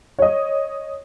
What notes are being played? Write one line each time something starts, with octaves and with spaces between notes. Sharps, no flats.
C#5 D#5